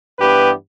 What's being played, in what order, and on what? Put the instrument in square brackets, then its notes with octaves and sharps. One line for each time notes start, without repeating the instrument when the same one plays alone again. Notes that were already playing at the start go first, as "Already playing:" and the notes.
[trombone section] G2 E3 B3 G4 B4